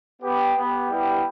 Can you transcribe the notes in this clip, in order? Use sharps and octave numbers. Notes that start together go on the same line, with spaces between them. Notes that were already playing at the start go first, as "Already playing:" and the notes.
B3 G4
B3
G4
G3 B3 E4 G4